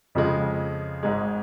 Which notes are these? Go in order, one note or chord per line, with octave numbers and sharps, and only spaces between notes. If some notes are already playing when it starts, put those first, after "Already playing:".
F2 C#3 F3 G#3
G#1 G#2 G#3